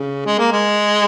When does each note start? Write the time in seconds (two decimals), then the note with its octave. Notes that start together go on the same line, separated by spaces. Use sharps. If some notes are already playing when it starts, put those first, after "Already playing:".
Already playing: C#3
0.26 G#3
0.39 A#3
0.52 G#3